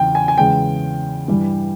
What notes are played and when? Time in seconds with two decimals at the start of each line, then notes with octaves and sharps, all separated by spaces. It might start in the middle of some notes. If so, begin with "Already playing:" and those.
Already playing: E2 C#3 G5
0.15 G#5
0.28 G#5
0.38 E2 C#3 G#3 G5
1.28 G2 E3 G3